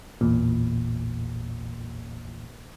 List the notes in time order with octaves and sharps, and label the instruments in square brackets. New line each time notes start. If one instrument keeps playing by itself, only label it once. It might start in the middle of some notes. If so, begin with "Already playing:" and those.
[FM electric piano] A1 E2 A#2